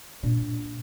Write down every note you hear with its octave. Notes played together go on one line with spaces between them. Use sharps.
A#2 D4